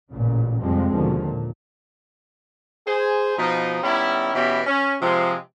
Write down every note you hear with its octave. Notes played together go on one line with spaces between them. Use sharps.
A1 A#2 C#3
F2 C3 F3 G3 G#3 C4
D#2 B2 D3 F3
A#2
G#4 C5
B2 F3 D#4
D#3 G3 B3 C#4 E4
B2 E3 B3 C#4 G4 E5
C#4
C3 F3 G#3